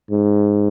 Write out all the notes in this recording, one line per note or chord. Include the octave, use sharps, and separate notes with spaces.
G#2